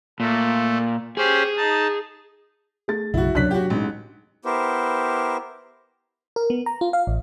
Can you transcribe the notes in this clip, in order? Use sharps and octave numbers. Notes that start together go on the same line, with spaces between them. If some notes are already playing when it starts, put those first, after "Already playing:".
A#2 A3
C#4 G4 G#4 C5
D#4 A5
A3 G#4 A6
B1 F#2 C#3 E4 F#4
F#1 C#2 C3 D4 C#5 F#6 B6
D4 F#4 G4
A1 G#3 D#4
B3 E4 G4 A#4 C5
A#4
B3
A#5
F4
F5
A1